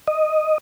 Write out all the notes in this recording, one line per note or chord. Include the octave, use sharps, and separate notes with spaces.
D#5